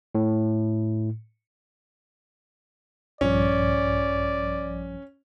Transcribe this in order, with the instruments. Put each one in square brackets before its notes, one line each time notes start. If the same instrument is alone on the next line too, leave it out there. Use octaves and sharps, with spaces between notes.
[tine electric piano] A2
[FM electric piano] A#1 G2 F3 [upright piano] C#4 [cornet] D5